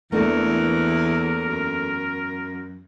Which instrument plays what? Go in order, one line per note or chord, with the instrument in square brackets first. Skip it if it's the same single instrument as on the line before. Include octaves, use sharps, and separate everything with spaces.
[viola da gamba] E2 [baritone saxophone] E3 [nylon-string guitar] A3 A#3 D4 [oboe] A#4
[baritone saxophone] F#2